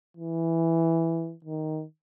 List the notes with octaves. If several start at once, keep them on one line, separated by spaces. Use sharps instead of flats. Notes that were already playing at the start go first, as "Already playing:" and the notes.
E3
D#3